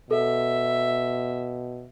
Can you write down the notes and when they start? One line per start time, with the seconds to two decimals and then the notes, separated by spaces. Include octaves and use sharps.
0.11 B2 A4 E5